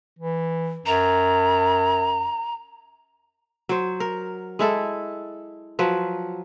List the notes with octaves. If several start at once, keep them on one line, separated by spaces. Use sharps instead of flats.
E3
F#2 A#5
F#3 C5
A#4
G#3 E4 A4
F3 F#3 B4